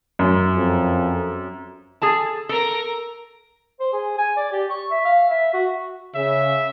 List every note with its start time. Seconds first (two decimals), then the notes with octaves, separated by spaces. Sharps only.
0.19 F#2
0.55 F2
2.02 G#4 A4 A5
2.49 A4 A#4 A#5
3.80 C5
3.93 G#4
4.18 G#5
4.37 D5
4.52 G4
4.70 C#6
4.91 E5
5.05 F5
5.30 E5
5.53 F#4
6.15 C#3 E5